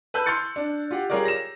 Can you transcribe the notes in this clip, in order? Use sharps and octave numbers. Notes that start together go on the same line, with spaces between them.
B4 A5 B5 E6 F#6 G6
C6 F6 G6 A6 C#7
D4
F4 G4 F#5
G3 F4 G#4 A#4 C#5 D5
A#6 E7